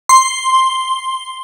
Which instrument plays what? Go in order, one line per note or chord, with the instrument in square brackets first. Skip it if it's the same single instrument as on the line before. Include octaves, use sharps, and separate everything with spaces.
[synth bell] C6